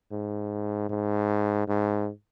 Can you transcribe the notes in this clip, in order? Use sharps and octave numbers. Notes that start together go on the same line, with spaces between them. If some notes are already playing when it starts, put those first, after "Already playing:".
G#2
G#2
G#2